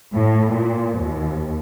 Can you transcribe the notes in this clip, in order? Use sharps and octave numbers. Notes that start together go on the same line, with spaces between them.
A2
A#2
D#2